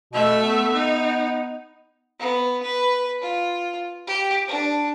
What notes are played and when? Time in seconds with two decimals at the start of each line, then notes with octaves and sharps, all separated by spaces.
0.13 B2 A3 E5
0.43 B3
0.73 D#4
2.20 B3
2.63 B4
3.21 F4
4.07 G4
4.48 D4